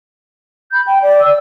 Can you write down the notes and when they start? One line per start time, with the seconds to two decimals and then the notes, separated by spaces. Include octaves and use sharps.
0.72 B5 G6
0.87 G5
1.02 D5
1.21 E6